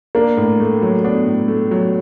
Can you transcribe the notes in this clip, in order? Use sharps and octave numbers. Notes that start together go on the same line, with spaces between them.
A#3 D4
A2
A3
F#3
B3 D4
A2
A3
F#3